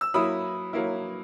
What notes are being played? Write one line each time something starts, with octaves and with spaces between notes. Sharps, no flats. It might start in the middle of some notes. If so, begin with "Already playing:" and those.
E6
F#3 A#3 E4 B5 D#6
F#3 A#3 E4